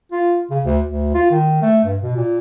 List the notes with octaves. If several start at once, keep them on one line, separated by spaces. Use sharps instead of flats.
F4
C#3
D2
D2
F4
D#3
A3
G2
B2
A#2